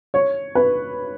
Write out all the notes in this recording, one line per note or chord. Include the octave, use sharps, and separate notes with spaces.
C#5
B4